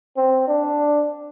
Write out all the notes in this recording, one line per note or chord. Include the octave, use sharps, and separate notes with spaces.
C4
D4